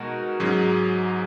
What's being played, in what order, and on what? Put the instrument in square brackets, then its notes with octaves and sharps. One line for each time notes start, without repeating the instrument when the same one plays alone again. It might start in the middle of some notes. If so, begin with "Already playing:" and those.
Already playing: [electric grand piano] B2 G#3 D#4 F#4 A#4
G#2 F#3 C#4 G#4